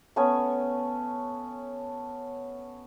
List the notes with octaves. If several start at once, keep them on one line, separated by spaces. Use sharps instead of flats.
A3 B3 C#4 G#5